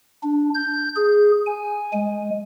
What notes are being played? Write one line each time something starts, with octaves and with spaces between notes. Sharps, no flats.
D4
G6
G#4
G#5
G#3